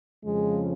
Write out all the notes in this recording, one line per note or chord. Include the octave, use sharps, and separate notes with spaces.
F2 C#3 F3 G#3